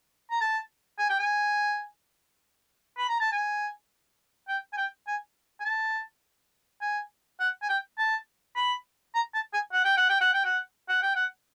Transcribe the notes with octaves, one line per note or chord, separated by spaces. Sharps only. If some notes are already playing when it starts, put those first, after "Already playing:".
A#5
A5
G#5
G5
G#5
B5
A#5
A5
G#5
G5
G#5
G5
G#5
G#5
A5
G#5
F#5
G#5
G5
A5
B5
A#5
A5
G#5
F#5
G5
F#5
G5
F#5
G5
F#5
F#5
G5
F#5